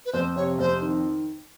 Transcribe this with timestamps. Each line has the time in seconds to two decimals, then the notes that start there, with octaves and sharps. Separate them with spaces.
0.06 B4
0.13 F2 C5
0.36 C3 C#5
0.59 F2 C5
0.81 D#3